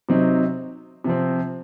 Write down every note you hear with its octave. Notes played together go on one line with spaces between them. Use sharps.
C3 F#3 C4 D#4
C3 F3 C4